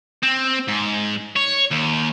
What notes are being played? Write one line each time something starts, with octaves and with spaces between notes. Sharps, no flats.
C4
G#2
C#5
D#2